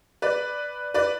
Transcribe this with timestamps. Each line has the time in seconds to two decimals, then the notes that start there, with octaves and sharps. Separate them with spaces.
0.22 B4 D5
0.94 B4 D5